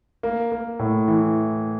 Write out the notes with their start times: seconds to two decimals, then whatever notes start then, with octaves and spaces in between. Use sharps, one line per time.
0.23 A#3
0.52 A#3
0.79 A2
1.08 E3